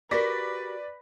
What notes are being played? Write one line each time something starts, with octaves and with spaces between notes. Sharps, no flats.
F#4 G4 A#4 B4 D5 A#6 B6